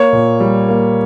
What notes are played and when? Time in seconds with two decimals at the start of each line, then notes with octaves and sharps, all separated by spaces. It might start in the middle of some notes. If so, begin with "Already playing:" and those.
Already playing: A#3 C#5
0.13 A#2
0.40 G3
0.69 A#3